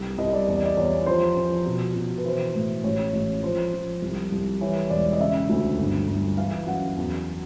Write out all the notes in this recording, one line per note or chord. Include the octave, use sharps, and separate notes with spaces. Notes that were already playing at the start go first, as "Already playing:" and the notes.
Already playing: C2
C2 D#5
D5
E2 D5
D#5
D5
E2 C#5
F3 C5
F3
B2
B2
B4
E3 C5
A2
A1 C#5
A1
F3 C5
F3
C2
C2
E3 C#5
E1 D5
D#5
C#3 E5
D2
G1
G1
E3 F5
F#2 F#5
E2